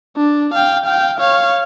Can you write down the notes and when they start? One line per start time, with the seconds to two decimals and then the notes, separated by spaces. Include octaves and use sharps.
0.17 D4
0.54 F5 G5
0.86 F5 G5
1.19 C#5 F5